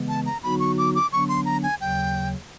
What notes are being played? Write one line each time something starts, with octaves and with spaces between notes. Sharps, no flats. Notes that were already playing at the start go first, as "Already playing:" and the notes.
Already playing: C#3 E3 G#3 B3
A5
A#5
D3 F#3 B3 D#4 F#4 B5
C#6
D6
D6
D3 F#3 B3 D4 C#6
C6
A#5
G#5
D#2 C#3 F#3 G5